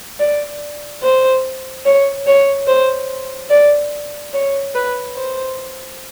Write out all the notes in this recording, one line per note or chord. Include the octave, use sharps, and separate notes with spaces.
D5
C5
C#5
C#5
C5
D5
C#5
B4
C5